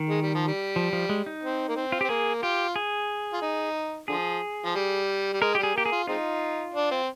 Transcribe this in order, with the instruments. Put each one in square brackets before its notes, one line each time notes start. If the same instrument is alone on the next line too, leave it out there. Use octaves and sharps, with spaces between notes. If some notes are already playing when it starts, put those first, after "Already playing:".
Already playing: [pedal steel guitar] D#3
[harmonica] G#3
G3
F3
G3
[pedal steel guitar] F3
F3
G#3
D#4
[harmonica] C4
A#3
C4
[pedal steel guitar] F4
[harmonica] C4 [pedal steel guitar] G4
[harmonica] A#3 [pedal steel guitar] G#4
[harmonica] F4 [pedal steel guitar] G4
[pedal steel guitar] G#4
[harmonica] F4
D#4
[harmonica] D3 F3 [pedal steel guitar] G#4
[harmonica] F3
G3
G3
[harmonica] G#3 [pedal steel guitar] A#4
[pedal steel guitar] G4
[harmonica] G3
[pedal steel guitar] G#4
[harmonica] A#3 [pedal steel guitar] G4
[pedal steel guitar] G#4
[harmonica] F4
[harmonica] G#3 C4 D#4 [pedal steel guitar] F4
[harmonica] D4
C4